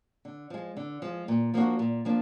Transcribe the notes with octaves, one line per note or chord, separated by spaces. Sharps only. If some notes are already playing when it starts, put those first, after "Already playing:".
D3
F3 G#3
D3
F3 G#3
A#2
F3 A#3 D4 F#4
A#2
F3 A#3 D4